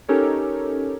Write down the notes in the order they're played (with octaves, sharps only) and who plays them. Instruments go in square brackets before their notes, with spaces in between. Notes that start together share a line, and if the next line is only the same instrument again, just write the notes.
[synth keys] C#4 D#4 G4 A4 A#4 C#5